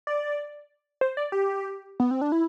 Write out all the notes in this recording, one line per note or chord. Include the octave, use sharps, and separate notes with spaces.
D5
C5
D5
G4
B3
C4
D4
E4